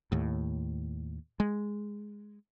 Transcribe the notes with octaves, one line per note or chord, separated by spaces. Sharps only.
D#2 A2
G#3